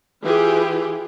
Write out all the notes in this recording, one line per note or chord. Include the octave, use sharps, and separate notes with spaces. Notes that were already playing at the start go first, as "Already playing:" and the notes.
E3 F4 G4 G#4